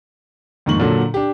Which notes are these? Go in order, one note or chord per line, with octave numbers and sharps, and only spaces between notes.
F2 G#2 D#3 A#3 C#6 F#7
A#2 D3 F#3 A4
D4 G4